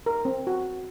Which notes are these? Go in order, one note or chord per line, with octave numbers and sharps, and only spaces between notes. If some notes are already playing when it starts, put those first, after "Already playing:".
A#4
C4
F#4